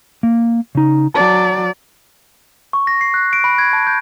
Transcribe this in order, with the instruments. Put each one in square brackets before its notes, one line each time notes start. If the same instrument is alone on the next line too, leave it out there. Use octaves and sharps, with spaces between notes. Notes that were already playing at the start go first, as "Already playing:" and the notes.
[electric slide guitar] A#3
C#3 D#4
[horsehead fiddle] F#3 D5 [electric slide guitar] A5
[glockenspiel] C#6
A#6
C7
F#6
D7
B5
G#6
A5
G6